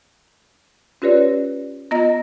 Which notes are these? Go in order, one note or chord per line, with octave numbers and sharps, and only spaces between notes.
C#4 F4 G4 B4 C#5 D5
B3 F4 D#5 A#5 A#6